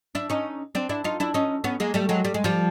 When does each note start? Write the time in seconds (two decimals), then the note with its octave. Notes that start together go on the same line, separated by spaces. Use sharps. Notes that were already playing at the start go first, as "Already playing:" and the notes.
0.15 D4 E4
0.30 C#4 D#4
0.75 C4 D4
0.89 D4 E4
1.04 D#4 F4
1.20 D4 E4
1.34 C#4 D#4
1.64 B3 C#4
1.80 G#3 A#3
1.94 G3 A3
2.09 F#3 G#3
2.25 G3
2.34 G#3
2.44 F3 G3